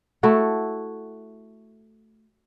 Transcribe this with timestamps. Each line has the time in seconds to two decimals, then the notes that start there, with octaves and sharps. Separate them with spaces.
0.23 A3 E4 F#4 A4